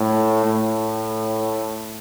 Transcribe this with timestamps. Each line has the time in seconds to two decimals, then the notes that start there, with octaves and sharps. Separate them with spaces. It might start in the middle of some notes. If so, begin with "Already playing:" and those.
Already playing: A2
0.45 A2